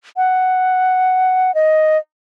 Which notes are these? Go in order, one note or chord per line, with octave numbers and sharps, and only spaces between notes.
F#5
D#5